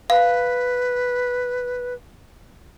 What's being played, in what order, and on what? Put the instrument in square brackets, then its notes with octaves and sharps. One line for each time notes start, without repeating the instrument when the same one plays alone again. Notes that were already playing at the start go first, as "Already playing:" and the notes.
[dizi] B4 [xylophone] F5